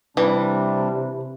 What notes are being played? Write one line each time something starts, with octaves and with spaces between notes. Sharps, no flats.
C3 E3 G3 D4